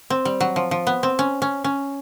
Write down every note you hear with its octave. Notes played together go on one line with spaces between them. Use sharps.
C4
G3
F#3
F3
F3
B3
C4
C#4
C#4
C#4